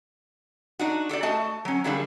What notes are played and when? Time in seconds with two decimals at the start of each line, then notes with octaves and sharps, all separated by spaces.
0.79 D4 D#4 F#4
1.09 G4 A4 C5 D5
1.23 A3 F#4 D#5 A5
1.65 F#3 C#4
1.84 D3 F#3 G3 A#3 D4 G#4